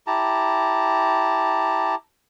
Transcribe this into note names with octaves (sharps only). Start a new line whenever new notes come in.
E4 G4 A5 A#5